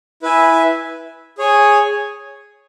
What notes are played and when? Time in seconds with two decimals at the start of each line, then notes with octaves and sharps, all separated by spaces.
0.22 E4 B4 E5 G#5
1.38 G#4 C#5 G#5